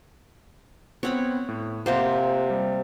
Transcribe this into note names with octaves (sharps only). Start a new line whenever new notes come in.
B3 C4 C#5 F#5 B5
A2
C3 A#3 F4 G4 C5 F#5
G3